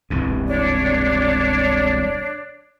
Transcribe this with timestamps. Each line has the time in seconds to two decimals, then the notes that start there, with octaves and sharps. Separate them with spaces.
0.10 E1 C2 G2
0.47 D4 C#5 D5